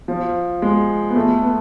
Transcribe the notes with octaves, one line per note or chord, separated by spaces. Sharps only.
F3
G#3
B3
A3
B3